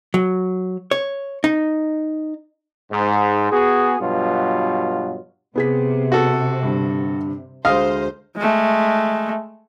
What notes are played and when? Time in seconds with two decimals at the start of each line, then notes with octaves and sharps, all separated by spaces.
0.14 F#3
0.91 C#5
1.44 D#4
2.90 G#2
3.51 B3 F#4 G#4
4.01 G2 B2 F#3 F4
5.56 C3 B3 G#4 B6
6.12 F#4 A4
6.63 G2 D3
7.65 D2 G#3 C5 D#5 F5 F6
8.37 G#3 A3